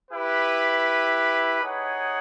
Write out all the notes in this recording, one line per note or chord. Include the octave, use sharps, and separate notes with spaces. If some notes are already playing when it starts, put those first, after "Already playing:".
E4 G4 B4
D#4 G#4 C#5 F#5